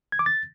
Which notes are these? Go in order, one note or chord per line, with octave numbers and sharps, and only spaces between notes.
G#6
D6
A6